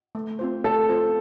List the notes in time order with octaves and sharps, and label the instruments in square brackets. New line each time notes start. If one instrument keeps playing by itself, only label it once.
[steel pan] A3
C4 F4 C5
[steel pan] A3 [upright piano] A4
[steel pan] C4 F4 C5